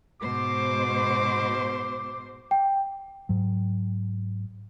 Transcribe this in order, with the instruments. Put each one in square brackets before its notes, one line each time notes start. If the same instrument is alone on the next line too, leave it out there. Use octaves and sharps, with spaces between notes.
[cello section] G#2 B2 C5 [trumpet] D6
[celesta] G5
[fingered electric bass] G#2 F#3